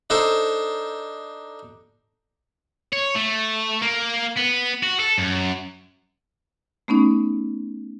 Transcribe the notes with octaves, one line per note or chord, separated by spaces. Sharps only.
D4 D#4 A4 C5
C#5
A3
A#3
B3
F#4
A4
F#2
A3 B3 C#4 D#4